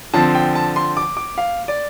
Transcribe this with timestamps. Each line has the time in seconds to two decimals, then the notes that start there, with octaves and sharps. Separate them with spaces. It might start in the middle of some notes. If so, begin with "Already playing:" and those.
0.13 D3 F3 C4 A5
0.35 G5
0.55 A5
0.76 C6
0.97 D6
1.17 D6
1.38 F5
1.68 D5